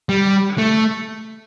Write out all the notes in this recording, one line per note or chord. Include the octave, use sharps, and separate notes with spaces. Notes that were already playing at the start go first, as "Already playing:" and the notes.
G3
A3